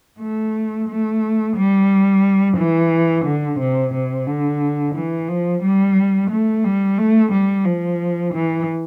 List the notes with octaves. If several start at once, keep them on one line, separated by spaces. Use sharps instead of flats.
A3
A3
G3
E3
D3
C3
C3
D3
E3
F3
G3
A3
G3
A3
G3
F3
E3